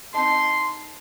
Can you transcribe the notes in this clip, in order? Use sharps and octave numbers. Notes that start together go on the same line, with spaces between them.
C4 D#4 A4 C6